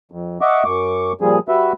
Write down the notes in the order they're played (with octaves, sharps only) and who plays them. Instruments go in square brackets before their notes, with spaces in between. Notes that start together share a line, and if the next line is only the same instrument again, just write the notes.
[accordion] F2
D#5 E5 F#5 C#6 D6
F#2 C#6 D6
A#2 F3 G3 G#4
G3 F#4 B4 E5